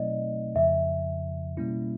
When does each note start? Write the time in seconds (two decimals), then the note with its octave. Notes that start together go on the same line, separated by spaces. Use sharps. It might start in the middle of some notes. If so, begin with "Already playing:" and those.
Already playing: B2 F#3 A3 C4 D#4 D5 D#5
0.55 F2 C#3 F3 E5
1.57 B2 G3 A#3 C#4 E4